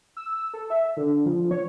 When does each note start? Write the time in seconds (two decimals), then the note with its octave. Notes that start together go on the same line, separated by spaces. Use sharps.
0.17 E6
0.34 E6
0.54 A4
0.70 E5
0.97 D3
1.26 F3
1.51 C#5